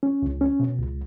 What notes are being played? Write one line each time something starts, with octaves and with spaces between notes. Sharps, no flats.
C#4
C#2
C#4
B2
C#2